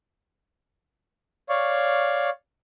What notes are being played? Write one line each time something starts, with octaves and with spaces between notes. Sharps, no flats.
C#5 D5 F5 C#6